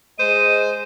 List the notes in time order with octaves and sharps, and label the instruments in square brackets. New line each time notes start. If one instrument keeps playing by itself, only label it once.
[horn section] G#3 C5 D#5 [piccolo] D#7